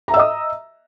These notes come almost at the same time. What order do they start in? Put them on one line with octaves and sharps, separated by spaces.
A#5 E5 E6 D#5 D#6